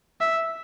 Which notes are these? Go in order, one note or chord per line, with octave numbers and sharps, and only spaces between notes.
E5